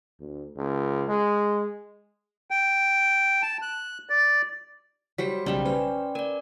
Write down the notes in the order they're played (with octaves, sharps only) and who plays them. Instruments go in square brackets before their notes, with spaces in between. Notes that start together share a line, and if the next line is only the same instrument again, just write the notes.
[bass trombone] D2
C#2
G#3
[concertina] G5
A5
F#6
D5
[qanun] F#3 G3 C5 [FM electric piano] C#5 [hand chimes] B6
[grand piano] B1 C#3 E7 [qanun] G3 B5 [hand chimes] D5 G5
[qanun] C#4 [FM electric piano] B4 [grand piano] C5
[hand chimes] A#4 D5 [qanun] G#5